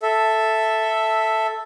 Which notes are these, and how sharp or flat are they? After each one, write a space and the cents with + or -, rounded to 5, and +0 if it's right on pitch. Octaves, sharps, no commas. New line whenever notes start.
A4 +0 E5 +0